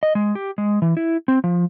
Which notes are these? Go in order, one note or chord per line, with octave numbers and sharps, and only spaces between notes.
D#5
G#3
G4
G#3
E3
E4
C4
F3